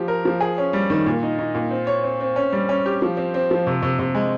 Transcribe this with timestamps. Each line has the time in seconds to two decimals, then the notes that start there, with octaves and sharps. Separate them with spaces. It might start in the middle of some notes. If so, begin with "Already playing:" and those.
Already playing: F3 G4
0.08 A#4
0.25 F3
0.41 G#4
0.58 C#4
0.73 G3
0.90 D#3
1.06 A#2
1.23 D#4
1.39 D#4
1.55 A#2
1.71 C4
1.87 C#5
2.04 C4
2.21 C4
2.36 C#4
2.52 G3
2.69 C#4
2.86 G4
3.02 F3
3.17 C4
3.34 C4
3.51 F3
3.67 C3
3.82 C3
3.99 C3
4.15 G#3